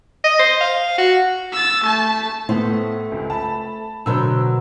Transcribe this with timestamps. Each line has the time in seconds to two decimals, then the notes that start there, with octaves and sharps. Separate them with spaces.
0.24 D#5
0.39 C5
0.61 F5
0.98 F#4
1.52 E6 A6
1.84 A3 A5
2.49 A2 A3 B3 C5
3.12 C#2
3.30 A5 B5
4.06 B2 D3 F#3 A#4 C5 E6